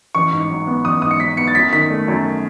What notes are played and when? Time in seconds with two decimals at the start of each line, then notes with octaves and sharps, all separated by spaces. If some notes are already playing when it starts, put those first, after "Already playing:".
0.15 A1 C#6
0.32 G#2
0.50 F#3
0.67 B3
0.85 A1 D#6
1.02 G#2 D#6
1.11 C#7
1.20 F#3 B6
1.37 B3 C#7
1.48 A6
1.55 F#2 B6
1.72 D#3 B6
1.90 A3
2.08 F#2